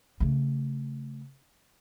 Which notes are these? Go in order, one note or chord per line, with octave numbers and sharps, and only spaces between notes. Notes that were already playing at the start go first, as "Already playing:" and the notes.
C#3 A3